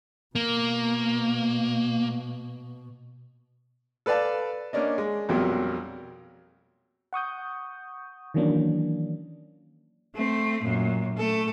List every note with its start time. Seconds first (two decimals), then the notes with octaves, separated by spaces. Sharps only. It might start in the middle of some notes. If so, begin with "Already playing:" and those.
0.35 B2 A#3
4.06 A4 B4 D5 F5 A5
4.73 A#3 C#4 D4 D#5
4.98 G#3
5.29 A#1 F2 B2 F#3 G3 A#3
7.13 F#5 C#6 D#6 G6
8.34 D#3 E3 F#3 A#3 C#4 D4
10.14 A3 C4
10.63 F#2 A#2
11.17 A3 A4